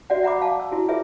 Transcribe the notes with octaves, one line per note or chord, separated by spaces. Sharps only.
F#4 D5 E5 F#5
E5 F#5 A#5 B5 D6
F5 A5
E6
E4 F#4
F4 G#4 A#4 B4 E5